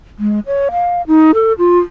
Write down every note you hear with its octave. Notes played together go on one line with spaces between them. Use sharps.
G#3
C#5
F5
D#4
A4
F4